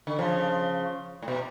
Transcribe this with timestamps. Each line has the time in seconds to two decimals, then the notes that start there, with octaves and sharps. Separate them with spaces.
0.07 D3
0.19 C#3 F3
1.22 A2
1.28 B2